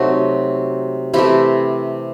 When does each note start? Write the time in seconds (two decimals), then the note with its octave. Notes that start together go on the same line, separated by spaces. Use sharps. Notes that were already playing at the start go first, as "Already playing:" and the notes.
Already playing: C3 F#3 A3 D#4 F#4
1.14 C3 E3 A3 E4 G4